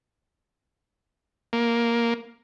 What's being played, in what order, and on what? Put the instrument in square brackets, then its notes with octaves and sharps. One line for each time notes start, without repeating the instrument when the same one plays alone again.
[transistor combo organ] A#3